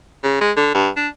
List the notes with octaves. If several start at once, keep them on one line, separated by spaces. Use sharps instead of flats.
C#3
G#3
D3
G2
D4